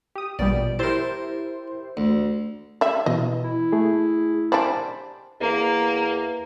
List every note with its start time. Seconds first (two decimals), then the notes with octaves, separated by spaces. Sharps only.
0.15 G4 D#6
0.39 A#1 B2 G3 D5
0.79 E4 G4 A#4 C5 A5
1.97 D2
2.81 G3 E5
3.06 B2 E3 D#5
3.44 E4
3.72 A3 G#4
4.52 G3 D4 C5 G#5 B5
5.41 E2 A#3